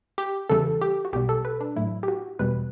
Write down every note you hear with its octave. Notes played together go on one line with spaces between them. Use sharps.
G4
E2 C#3 E3 G3 A4
G4
F#4
B1 B2 G3 G4
A4
B4
D4
A1 A2 F#3 E4
G4
F#4
E2 B2 G3 B4